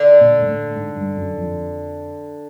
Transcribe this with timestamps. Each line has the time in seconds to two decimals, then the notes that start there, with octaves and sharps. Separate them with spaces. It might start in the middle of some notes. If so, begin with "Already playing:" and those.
Already playing: D3
0.21 A#2
0.41 G#2
0.48 A2
0.76 G#2
0.96 G2
1.17 F#2
1.38 F2